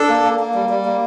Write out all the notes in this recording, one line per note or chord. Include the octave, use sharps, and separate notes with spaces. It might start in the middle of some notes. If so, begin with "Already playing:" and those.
Already playing: D4 A4
A#3
A#3
A#3
G3
G3
A#3